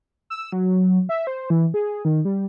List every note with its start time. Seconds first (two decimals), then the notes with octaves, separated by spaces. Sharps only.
0.30 E6
0.52 F#3
1.09 E5
1.27 C5
1.50 E3
1.74 G#4
2.05 D#3
2.25 G3